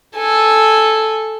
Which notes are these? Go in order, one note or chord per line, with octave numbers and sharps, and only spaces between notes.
A4 G#5